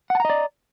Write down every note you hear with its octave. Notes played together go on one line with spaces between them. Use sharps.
D5 D#5 F#5 A5 A#5